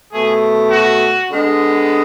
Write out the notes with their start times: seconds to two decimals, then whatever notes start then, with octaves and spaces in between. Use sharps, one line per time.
0.12 B2 A3 G#4
0.70 F#4
1.29 D3 G#3 B3